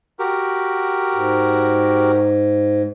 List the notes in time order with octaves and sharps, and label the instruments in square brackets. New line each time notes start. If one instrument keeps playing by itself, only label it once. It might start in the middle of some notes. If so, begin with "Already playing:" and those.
[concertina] F#4 G4 A#4
[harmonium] G#2